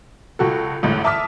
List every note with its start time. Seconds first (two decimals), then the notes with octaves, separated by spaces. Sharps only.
0.39 C#2 F#4 A4
0.83 A1 D2 G#2
1.04 E5 A5 D6 D#6 F6 B6